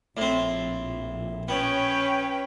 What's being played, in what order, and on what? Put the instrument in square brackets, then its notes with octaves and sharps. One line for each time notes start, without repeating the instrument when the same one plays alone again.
[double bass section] A#1 [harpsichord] A2 C4
[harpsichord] B3 [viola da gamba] C#4 B4 C#5 [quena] G5